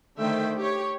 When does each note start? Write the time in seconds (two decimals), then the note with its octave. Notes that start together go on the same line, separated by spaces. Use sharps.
0.19 D3 D#3 A3 C5 E5 G5
0.58 G4 C#5